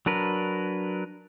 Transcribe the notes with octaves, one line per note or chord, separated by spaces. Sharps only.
F#3 D4 A#4 B4